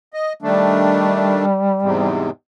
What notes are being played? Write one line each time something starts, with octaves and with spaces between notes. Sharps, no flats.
D#5
D#3 G3 A3 D4
E2 G#2 C3